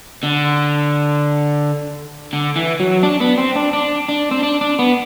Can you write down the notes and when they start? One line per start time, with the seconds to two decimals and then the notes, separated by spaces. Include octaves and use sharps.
0.23 D3
2.33 D3
2.56 E3
2.80 F#3
3.03 D4
3.21 B3
3.38 C4
3.56 D4
3.73 D4
4.08 D4
4.31 C4
4.43 D4
4.61 D4
4.79 B3